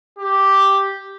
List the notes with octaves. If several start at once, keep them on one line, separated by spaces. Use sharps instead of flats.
G4